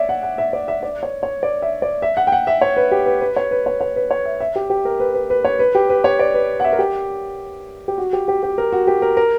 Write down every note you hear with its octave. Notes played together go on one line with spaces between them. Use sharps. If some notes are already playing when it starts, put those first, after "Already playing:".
Already playing: C#5 D5 E5
F#5
F#5
E5
D5
E5
D5
C#5
C#5
D5
E5
D5
E5
F#5
G5
F#5
E5
C#5
B4
G4
B4
B4
C#5
B4
C#5
C#5
B4
C#5
E5
E5
G4
G4
A#4
B4
B4
B4
C#5
B4
G4
B4
C#5
D5
B4
F#5
E5
A#4
G4
G4
F#4
G4
G4
G4
A#4
F#4
G4
A#4
A#4